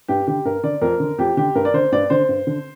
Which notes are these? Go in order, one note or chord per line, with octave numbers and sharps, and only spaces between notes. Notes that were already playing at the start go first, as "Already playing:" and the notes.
G2 G4
D3 G4
G2 A#4
D3 D5
F2 A#4
D3
F2 G4
D3 G4
G2 A#4
D5
D3 C5
G2 D5
D3 C5
G2
D3